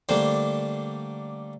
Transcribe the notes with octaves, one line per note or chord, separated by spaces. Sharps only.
D3 G3 A3 A#3 D4 C5